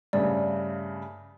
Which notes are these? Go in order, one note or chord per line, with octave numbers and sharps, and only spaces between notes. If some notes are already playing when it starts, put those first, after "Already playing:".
G2 C#3 A3 D5